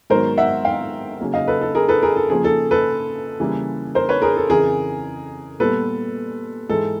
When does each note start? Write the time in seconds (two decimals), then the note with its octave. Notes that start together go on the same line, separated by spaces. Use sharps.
0.10 G#2 D#3 F#3 B3 A#4 C5
0.38 E5 F#5
0.65 F5 G5
1.21 C#3 F#3 A#3
1.33 D#5 F5
1.48 A4 B4
1.61 A4
1.75 G#4 A#4
1.88 A4 B4
2.02 G#4 A#4
2.16 A4
2.29 C#3 F3 A#3 G#4
2.44 A4
2.71 A4 B4
3.40 C#3 E3 G3 A#3
3.95 A#4 C5
4.09 B4 C#5
4.22 G#4 A#4
4.37 A4
4.49 F2 C#3 E3 G#4 A#4
5.60 A#2 G3 B3 A4 B4
6.69 G#2 E3 G#3 A4